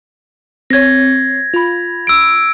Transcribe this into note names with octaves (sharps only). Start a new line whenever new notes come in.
C4 C#5 G#6 A#6
F4 B5
E6 D7